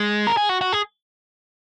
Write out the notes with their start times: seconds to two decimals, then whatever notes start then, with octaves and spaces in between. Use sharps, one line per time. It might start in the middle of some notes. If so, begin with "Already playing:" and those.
Already playing: G#3
0.27 A#4
0.37 G#4
0.49 F#4
0.61 F#4
0.72 G#4